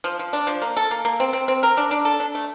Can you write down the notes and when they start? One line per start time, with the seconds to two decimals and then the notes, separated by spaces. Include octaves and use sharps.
0.04 F3
0.19 F3
0.33 D4
0.47 F3
0.62 A#3
0.77 A4
0.91 A#3
1.05 A#3
1.20 C4
1.33 C4
1.48 C4
1.63 A#4
1.77 D4
1.91 D4
2.05 A4
2.20 D4
2.35 A3